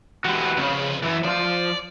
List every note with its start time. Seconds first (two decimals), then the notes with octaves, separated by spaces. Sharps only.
0.25 E3 G#3 F#4 G4 B4
0.57 F2 C#3 B4
1.02 F#2 E3
1.24 F3 F4 D5